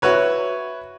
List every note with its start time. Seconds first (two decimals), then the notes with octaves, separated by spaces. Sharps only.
0.02 E4 F#4 B4 C#5